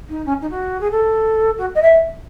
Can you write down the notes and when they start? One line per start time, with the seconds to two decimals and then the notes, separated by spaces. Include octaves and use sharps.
0.09 D#4
0.26 C#4
0.41 D#4
0.50 F#4
0.80 G#4
0.91 A4
1.58 F#4
1.75 D#5
1.82 E5